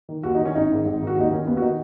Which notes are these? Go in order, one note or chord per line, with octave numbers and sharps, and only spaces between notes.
D#3
D#2 F#4
D#3 D#4
C#4
G#1 D#4
G#2 D#3
G#1
G#2 D#3
F#4
D#2 D#4
D#3 C#4
D#2 B3
F#4
D#3 D#4